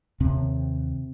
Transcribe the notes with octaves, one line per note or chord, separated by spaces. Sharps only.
D#2 C3 C4